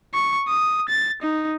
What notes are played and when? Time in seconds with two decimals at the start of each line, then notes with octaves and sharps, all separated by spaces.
0.14 C#6
0.48 D#6
0.89 A6
1.23 D#4